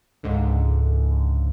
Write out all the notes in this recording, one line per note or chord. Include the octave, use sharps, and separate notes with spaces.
C#2 G#2 D3